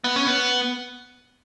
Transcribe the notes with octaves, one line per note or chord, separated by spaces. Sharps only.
B3
C#4
B3